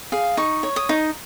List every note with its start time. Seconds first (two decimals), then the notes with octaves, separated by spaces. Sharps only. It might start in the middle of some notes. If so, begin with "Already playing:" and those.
0.12 G#4 F5
0.37 D#4 C#6
0.63 C#5
0.76 D#6
0.89 D#4